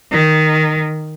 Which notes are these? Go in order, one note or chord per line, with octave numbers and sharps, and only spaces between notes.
D#3